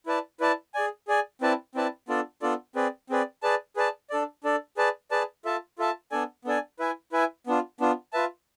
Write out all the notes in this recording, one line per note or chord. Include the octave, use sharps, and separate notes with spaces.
E4 B4 D5 A5
E4 B4 D5 A5
G#4 D5 G#5
G#4 D5 G#5
C4 E4 B4 D5 A5
C4 E4 B4 D5 A5
B3 D4 F4 A4 D5
B3 D4 F4 A4 D5
C4 G#4 B4 D5
C4 G#4 B4 D5
G#4 B4 D5 A5
G#4 B4 D5 A5
D4 A4 D5
D4 A4 D5
G#4 B4 D5 A5
G#4 B4 D5 A5
F4 A4 E5 A5
F4 A4 E5 A5
B3 D4 A4 D5 G#5
B3 D4 A4 D5 G#5
E4 B4 E5 G#5
E4 B4 E5 G#5
B3 D4 F4
B3 D4 F4
F4 B4 E5 A5